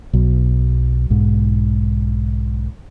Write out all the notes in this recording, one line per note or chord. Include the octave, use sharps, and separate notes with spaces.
B1 F#3
B1 G#2